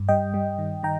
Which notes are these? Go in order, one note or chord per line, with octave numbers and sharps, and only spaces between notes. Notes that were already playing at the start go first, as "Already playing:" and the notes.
Already playing: G2
G3 D#5 G5
G3
D#3
D#3 G5 A#5